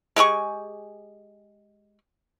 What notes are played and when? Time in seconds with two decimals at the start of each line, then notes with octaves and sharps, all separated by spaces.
0.16 G#3 G4 G#4 C#6